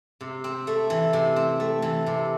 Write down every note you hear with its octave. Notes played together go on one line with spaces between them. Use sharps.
C3
C4
A3
E3
C3
C4
A3
E3
C3